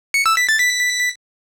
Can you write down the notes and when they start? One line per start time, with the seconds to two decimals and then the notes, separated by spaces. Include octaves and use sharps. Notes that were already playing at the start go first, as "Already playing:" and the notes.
0.14 C#7
0.26 E6
0.37 B6
0.49 A6
0.60 B6